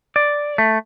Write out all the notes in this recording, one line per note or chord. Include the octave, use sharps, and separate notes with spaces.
D5
A3